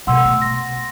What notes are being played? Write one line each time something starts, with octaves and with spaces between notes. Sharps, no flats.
B2 G#3 F#5 C6 E6
A3 B3
A#6